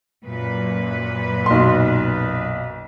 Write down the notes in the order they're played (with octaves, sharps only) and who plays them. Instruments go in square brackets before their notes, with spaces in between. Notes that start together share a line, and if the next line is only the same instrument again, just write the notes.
[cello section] F#2 A#2 B4
[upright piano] B1 C6